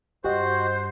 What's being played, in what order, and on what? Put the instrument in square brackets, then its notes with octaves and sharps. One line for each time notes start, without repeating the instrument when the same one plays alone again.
[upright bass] G2 [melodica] F#4 [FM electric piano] G4 D#5 [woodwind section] C5